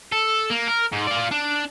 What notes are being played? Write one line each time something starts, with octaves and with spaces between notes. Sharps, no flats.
A4
A#3
A#4
G#2
F4 D5
D4